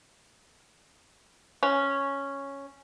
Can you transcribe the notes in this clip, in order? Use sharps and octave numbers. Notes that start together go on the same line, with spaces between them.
C#4